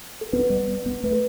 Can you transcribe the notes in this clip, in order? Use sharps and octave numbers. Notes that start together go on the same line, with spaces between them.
A4
B3 B4
G3
B3
B3
A3 B4
A4